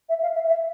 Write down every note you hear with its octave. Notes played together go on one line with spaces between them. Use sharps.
E5
F5
E5
E5